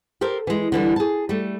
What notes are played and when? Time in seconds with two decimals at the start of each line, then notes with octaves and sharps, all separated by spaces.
0.21 G4 A4 A#4 C5
0.47 E3 G#3
0.72 D3 E3 G3
0.96 G#4 A5
1.29 G3 A3